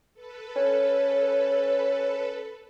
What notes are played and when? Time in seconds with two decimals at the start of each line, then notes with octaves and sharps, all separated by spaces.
0.14 A4 B4
0.56 C#4